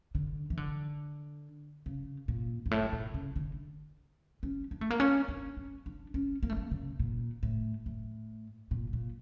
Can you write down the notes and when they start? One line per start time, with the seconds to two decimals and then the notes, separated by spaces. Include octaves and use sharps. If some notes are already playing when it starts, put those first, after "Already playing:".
0.15 D3
0.50 E3
0.57 D3
1.86 C#3
2.28 A#2
2.66 G2
2.71 A2
2.93 A#2
3.14 C#3
3.36 D3
4.43 C#4
4.71 D4
4.81 A3
4.90 A#3
5.00 C#4
5.28 D4
5.57 C#4
5.86 D4
6.14 C#4
6.43 A#3
6.50 A3
6.57 A#3
6.71 C#3
6.99 A#2
7.43 A2
7.86 A2
8.71 A#2
8.93 A#2